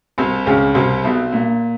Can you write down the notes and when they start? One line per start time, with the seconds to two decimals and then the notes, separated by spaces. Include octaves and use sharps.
0.18 C2 C3
0.46 C#2 C#3
0.74 C2 C3
1.04 B1 B2
1.32 A#2